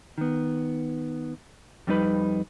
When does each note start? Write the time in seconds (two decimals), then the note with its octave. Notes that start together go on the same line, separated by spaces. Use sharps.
0.18 D#3 B3
1.87 F2 G3 B3 D#4 B4 B5